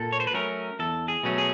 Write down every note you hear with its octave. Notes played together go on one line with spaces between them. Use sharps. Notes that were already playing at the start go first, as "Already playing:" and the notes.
Already playing: A#2 A4
C#5
C5
B4
F#3 A3 C#4 A#4
E2 A4
G#4
B2 F#3 A3 C#4
G#4